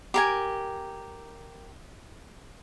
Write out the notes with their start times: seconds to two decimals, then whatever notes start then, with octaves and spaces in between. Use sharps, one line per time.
0.14 G4 A#4 G#5